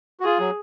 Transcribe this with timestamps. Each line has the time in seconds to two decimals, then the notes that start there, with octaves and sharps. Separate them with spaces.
0.20 F#4
0.24 F4 G#4
0.39 F#3